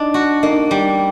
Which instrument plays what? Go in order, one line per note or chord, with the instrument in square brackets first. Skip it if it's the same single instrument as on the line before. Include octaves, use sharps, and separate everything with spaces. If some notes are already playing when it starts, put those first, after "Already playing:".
Already playing: [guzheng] D4 [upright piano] D#4 D#5
[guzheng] F#4
[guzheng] A#3 [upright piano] D#4 D#5
[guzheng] G3